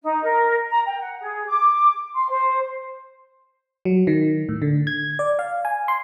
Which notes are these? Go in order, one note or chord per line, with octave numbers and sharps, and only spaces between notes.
D#4
A#4
A#5
G5
F#5
G#4
D6
C6
C5
F#3
D#3
A2
D3
G#6
D5
F5
G#5
C6